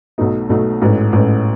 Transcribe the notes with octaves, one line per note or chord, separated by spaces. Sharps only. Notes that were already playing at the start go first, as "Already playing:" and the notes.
B1 B2 F#3 A3 D#4
B1 B2 F#3 A3 D#4
A1 G#2 E3 A3 C#4
A1 G#2 E3 A3 C#4